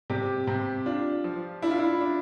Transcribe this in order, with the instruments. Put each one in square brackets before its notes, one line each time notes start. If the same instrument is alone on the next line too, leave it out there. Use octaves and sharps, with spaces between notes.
[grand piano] C3 [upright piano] G4
[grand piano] C3
[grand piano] D4 [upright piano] F4
[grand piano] F3
[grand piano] D4 [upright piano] E4
[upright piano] F4
E4
[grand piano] D4